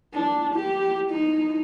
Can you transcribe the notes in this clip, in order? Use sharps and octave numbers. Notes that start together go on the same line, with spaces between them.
D4
G4
D#4